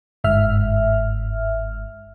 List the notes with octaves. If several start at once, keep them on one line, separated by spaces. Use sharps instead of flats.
G1 G#2 E5 F6